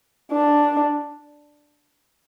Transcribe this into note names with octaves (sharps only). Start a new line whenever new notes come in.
D4